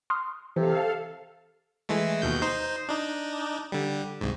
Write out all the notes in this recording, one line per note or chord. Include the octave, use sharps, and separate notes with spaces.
C6 D#6 F6
C3 E3 A4 F5
E3 G#3 A3
D#2 B2 G6
D#4 C5
D4 D#4
D3 G3
C2 G#2